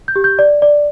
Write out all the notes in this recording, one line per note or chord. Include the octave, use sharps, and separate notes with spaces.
G6
G4
G6
D5
D5